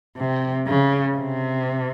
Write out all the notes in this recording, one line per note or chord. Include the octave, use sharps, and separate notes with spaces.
C3
C#3
C3